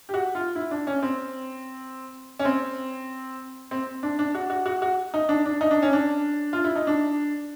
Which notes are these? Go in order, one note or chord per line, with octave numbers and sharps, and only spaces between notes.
G4
F#4
F4
E4
D4
C#4
C4
C#4
C4
C4
D4
D4
F#4
F#4
F#4
F#4
D#4
D4
D4
D#4
D4
C#4
D4
F4
E4
D#4
D4